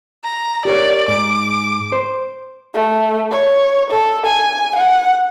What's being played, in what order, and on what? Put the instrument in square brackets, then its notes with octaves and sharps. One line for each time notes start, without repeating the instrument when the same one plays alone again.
[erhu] A#5
[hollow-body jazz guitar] G4 A#4 C#5 [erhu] D5
[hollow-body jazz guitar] G#2 [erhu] D6
[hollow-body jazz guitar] C5
[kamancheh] A3
C#5
A4
G#5
F#5